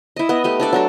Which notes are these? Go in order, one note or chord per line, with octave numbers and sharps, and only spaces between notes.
E4 D#5
B3 D#5
A3 G4 D#5
D4 A4 D5
F#3 D4 A4